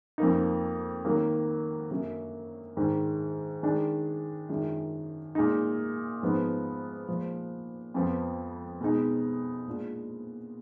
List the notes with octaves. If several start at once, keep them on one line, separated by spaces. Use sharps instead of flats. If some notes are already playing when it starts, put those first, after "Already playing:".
F2 F3 A#3 D#4
D#3 F#3 A#3
F#2 D3 F#3 A#3
G#2 D#3 G#3 D4
D#3 G#3 D4
F#2 D#3 G#3 D4 F4
A#2 G#3 D#4
G#2 F3 B3 D#4
A#2 F3 G#3
F2 F3 B3
B2 G#3 D#4
A#2 G#3 D4 F4